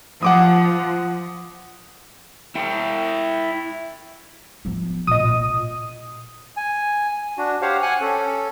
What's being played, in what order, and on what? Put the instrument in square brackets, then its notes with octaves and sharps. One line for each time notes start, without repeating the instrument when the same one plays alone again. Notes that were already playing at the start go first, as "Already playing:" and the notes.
[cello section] F3 [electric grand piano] F#5 D6 D#6
[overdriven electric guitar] E4 G5
[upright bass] F3 B3
[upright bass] A#2 [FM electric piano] D#5 D#6
[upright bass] A#2
[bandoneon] G#5
D4 F#4
G4 C5 C#5 F5 F#5
F#5 G#5 F#6
C#4 A4